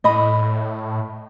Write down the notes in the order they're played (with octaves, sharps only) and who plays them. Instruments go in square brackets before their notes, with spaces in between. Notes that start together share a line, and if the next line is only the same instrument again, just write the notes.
[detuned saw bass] A2 [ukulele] D#5 B5